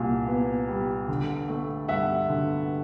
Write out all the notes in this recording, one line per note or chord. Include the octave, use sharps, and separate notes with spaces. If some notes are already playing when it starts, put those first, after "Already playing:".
Already playing: C2 A#2
B3
G3
D3
A3
G2 E5 F#5
D3